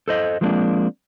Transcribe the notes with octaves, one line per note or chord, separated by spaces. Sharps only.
A4 C5 D#5
F3 G#3 A#3 C4 D4